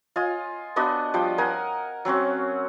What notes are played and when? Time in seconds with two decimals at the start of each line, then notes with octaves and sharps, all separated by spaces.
0.16 F4 D#5 G#5
0.76 B3 D4 F#4 D#5
1.14 F3 G3 G5
1.38 A#4 D#5 F#5 G#5
2.05 F#3 C4 C#4 F#4